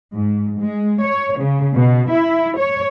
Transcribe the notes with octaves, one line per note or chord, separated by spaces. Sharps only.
G#2
G#3
C#5
C#3
B2
E4
C#5